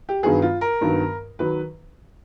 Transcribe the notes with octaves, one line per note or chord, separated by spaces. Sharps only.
G4
G2 D#3 F#3 B3 G#4
F4
A#4
G2 D#3 F#3 B3
D#3 F#3 B4